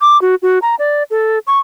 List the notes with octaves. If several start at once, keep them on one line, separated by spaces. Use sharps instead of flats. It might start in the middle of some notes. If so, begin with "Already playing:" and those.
D6
F#4
F#4
A#5
D5
A4
C#6